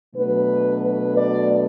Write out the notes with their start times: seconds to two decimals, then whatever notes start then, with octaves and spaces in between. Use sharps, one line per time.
0.14 B2 F#3 A3 D4 B4
0.82 B4
1.17 D5